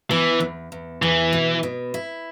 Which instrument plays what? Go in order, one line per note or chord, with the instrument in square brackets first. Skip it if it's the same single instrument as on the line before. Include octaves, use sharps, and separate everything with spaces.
[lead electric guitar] E3 [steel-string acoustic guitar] B3
[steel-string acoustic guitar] E2
E2
[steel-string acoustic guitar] E2 [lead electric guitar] E3
[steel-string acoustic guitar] B2
B2
E4